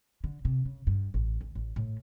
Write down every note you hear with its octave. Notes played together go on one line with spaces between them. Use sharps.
D3
C3
C#3
G2
A1
D2
A1
A2